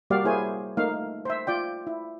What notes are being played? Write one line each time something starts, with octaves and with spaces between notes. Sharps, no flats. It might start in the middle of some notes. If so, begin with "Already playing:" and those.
G3 A#3 F#4 G4 D5 F5
A#3 E4 G#4 C5 C#5 G#5
A3 A#3 D#4 F5
C5 E5
F4 D5 G5
E4